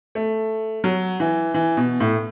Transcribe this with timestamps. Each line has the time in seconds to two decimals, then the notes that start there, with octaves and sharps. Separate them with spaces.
0.15 A3
0.84 F#3
1.20 E3
1.54 E3
1.77 B2
2.00 A2